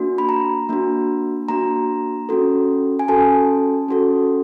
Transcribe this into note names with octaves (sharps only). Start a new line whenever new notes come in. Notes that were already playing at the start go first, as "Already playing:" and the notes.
Already playing: A#3 D4 F#4
B5
A#5
A#3 D4 F#4
A#3 D4 F#4 A#5
C#4 F#4 A4
G#5
C#4 F#4 A4 A5
C#4 F#4 A4